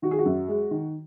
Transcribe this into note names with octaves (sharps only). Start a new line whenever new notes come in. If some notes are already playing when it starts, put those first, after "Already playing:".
D#3 F#4
G#4
F#4
F#2
G#3
D#3